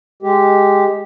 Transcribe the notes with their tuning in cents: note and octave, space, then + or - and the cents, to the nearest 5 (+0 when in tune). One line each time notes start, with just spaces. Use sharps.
G#3 +0 G4 +0